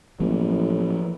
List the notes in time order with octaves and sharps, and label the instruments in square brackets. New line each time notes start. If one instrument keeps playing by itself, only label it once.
[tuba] A1 [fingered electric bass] F3 F#3 A#3